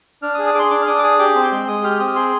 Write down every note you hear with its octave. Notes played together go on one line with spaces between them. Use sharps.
D4 F6
D#6
G#4
D#6
G#4 C6 D6
D4 D6
F6
D4 D#6
D6
G#4 D#6
G4 D6
C4
C6
G#3
G#3 D#6
G4 F6
C4 D#6
G#4 C6